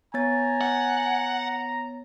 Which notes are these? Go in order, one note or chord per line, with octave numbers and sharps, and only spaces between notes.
B3 C#5 G#5 A#5 A6
F#5